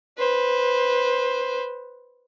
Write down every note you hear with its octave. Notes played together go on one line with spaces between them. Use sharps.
B4 C5